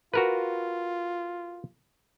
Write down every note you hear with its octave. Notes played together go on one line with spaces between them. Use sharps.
F4 F#4 A#4 B4